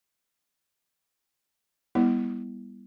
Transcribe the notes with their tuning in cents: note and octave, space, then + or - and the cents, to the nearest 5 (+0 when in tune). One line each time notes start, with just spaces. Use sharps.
G3 +25 B3 -15 E4 -10